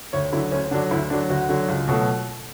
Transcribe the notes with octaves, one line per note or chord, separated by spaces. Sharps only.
D2 C#5
D3 F#3 E4
D2 C#4
D3 F#3 D4
D2 E4
D3 F#3 D4
D2 F#4
D3 F#3
C#2
B2 F#3 A3